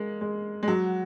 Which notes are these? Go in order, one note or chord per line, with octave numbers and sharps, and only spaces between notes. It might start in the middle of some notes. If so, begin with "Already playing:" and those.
Already playing: G#3 A#3
G#3
G#3
F#3